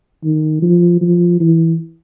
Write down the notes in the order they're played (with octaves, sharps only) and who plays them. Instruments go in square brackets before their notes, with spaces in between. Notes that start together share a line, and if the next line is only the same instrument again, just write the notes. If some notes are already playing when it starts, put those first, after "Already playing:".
[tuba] D#3
F3
F3
E3